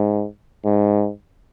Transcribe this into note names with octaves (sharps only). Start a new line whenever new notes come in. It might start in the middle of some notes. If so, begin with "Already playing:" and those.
Already playing: G#2
G#2